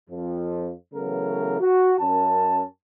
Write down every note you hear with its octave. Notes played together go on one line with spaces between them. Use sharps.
F2 F3
C#3 E3 F#3 A3 B3 A#4
F#4
F#2 C#4 A#4 A5